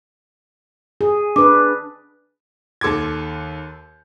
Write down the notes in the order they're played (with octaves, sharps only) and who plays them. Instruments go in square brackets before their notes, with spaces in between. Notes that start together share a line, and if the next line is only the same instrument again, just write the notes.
[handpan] G#4
[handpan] D4 B4 [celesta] D6
[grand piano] D#2 A4 C6 D6 G#6